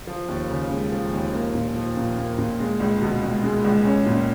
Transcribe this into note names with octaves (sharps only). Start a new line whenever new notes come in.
F3
D#2
C#3
G#3
F3
D#2
A#3
A#2
F3
A#2
A#3
A#2
G#3
C#2
B2
C#2
G#3
C#2
C#4
A#2